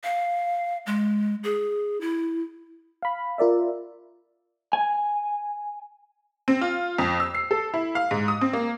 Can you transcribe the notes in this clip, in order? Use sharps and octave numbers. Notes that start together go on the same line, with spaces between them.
F5
G#3
G#4
E4
F5 B5
F4 A#4 D5 E5
G#5
C4
F4
F2
E6
C7
A4
E4
F5
G#2
D#6
C4
A#3